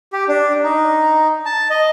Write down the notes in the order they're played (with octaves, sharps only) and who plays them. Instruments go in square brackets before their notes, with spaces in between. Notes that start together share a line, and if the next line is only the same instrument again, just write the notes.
[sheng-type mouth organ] G4
D4
D#4
A5
D#5